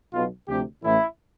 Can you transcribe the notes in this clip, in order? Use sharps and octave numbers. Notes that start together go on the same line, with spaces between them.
B1 B2 F4
D2 C3 F3 G4
A1 A2 E3 E4